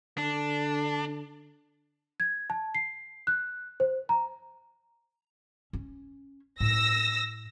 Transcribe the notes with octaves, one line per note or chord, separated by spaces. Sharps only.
D3 D4
G#6
A5
C7
F#6
C5
A#5
C#4
A2 E6 A#6